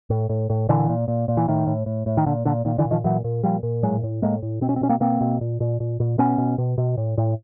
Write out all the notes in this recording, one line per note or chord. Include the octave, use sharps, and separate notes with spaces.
A2
A2
A2
A#2 D3 E3
A#2
A#2
A#2
E3
A2 D#3
A2
A2
A2
D#3
A#2 D3
A#2 D3
A#2 D#3
D3 E3
A#2
D#3 F3
A#2 E3 F#3
A#2
A#2 F3 G3
A#2
A2 F#3 G#3
A2
A2 G#3 A#3
A2
B2 C4
C#4
C4
B2 C#4
A#3 C4
B2 A#3 C4
B2
A#2
A#2
A#2
A#2
B2 B3 C#4
B2
B2
B2
A2
A2